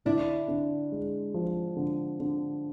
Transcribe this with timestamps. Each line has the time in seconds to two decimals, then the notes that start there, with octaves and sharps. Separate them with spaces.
0.05 D3 D4 E4
0.48 D3
0.92 G#3
1.34 F3
1.76 D3
2.20 D3